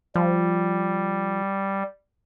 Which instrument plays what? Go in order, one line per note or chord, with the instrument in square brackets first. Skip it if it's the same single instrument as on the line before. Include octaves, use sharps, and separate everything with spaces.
[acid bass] F3 [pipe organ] G3